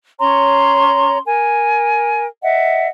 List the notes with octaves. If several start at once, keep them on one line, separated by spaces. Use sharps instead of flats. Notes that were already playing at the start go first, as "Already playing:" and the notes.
C#4 C#5 A#5 C6
A#4 G#5
D#5 E5 F#5